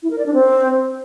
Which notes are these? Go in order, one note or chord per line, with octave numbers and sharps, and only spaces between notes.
E4
A#4
D5
D4
C4